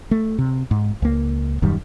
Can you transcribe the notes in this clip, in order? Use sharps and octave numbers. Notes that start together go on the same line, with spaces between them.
A3
C3
G#2
C#2 A#3
D#1 F#2 D#3 G3